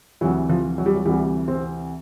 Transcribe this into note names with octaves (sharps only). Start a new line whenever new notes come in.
D2 C3 E3 F#3
F3
F#3
G3
F#3
D2 C3 E3 G3
C4